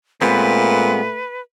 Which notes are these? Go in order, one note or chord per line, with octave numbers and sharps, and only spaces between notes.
A#2 G#3 A3 B3 C4 B4